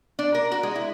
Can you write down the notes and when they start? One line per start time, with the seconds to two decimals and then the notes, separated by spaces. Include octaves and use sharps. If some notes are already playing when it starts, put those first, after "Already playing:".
0.19 D4
0.34 A#4
0.52 F#4
0.63 G#3
0.76 E4